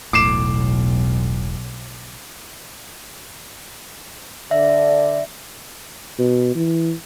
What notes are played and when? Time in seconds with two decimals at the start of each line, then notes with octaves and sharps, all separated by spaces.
0.13 E1 B1 A2 D6 C7 E7
4.51 D3 D5 E5
6.19 B2
6.55 E3